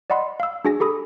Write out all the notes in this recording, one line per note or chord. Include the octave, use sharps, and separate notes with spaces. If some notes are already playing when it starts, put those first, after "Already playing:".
D5 D#5 F#5 B5 C6
F5 E6
D4 F#4 G#4 G#5 A#6
G4 A4 B5 D#6